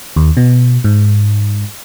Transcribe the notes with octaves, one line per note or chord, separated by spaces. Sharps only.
D#2
B2
G#2